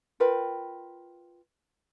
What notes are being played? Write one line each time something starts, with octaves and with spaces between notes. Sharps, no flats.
F4 A#4 B4 G5